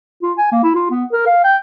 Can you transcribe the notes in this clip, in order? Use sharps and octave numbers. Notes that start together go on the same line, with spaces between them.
F4
G#5
A#3
E4
F4
B3
A#4
F5
G5